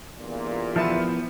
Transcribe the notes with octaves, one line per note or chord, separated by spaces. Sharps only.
E2 G2 A#2
F3 B3 E4 A5